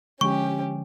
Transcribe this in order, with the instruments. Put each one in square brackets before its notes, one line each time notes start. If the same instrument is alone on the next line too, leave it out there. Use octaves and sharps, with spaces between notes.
[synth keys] D3 F3 G#3 [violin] C#4 G4 [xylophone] C#6